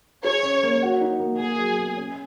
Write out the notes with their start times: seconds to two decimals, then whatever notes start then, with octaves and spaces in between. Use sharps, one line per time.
0.24 G#4 C#5
0.43 C#4
0.63 A#3
0.82 F#4
1.01 D#4
1.20 A#3
1.39 A#3 G#4
1.58 F#3
1.78 B2
1.97 C#4